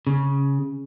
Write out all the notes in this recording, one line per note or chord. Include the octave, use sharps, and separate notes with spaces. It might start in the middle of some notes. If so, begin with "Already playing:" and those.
C#3